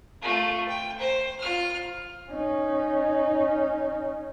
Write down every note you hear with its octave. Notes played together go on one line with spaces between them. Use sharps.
A3 F4
G5
C5
F4 F6
C#4 D#4